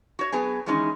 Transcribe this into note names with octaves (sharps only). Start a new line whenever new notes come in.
F#4 C#5
F#3 B3 G#4 G#5
D#3 E3 G#3 C#4 D#4